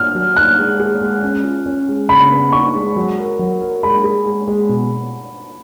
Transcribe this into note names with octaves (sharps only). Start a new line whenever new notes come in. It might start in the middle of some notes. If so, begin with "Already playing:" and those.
Already playing: F6
F#3
D#4 F#6
G#3
G#4
G#3
C#4
F4
C#4
G#3
C#3 B5
B3
D#4 C#6
G#3
F#3
A#4
F#3
A#4
G#3 B5
G#4
G#3
G#3
B2